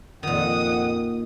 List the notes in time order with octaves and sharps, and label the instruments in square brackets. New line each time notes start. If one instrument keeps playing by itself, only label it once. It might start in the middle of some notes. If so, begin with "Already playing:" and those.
[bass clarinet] F2 [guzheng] A#2 D#3 [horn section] F3 F#5 [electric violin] D#6